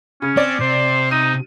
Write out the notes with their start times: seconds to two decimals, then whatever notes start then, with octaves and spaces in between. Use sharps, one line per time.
0.22 C#3 C#4
0.37 C4 D5
0.60 C3 C5
1.11 D#4 D#7